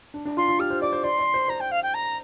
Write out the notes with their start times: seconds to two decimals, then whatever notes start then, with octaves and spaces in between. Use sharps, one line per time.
0.14 D4
0.25 D4
0.37 F4 C6
0.48 F4
0.59 G4 F6
0.70 C5
0.81 D5 D6
0.92 C5
1.03 D5 C6
1.19 D5
1.34 C5
1.48 C5 A#5
1.60 G5
1.71 F5
1.82 G5
1.94 A#5